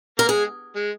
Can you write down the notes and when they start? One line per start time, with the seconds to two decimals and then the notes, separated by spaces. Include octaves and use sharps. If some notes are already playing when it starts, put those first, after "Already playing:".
0.18 A#3 A#4
0.29 G#3 G#4
0.76 G#3